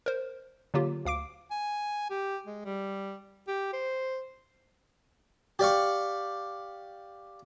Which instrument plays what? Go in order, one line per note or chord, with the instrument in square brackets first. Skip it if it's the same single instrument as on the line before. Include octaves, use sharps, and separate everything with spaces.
[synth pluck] A#4 C5
D3 F#3 A#3 F4 G4
D2 F5 D6 D7
[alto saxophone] G#5
G4
G#3
G3
G4
C5
[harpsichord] G4 D5 F5 C#6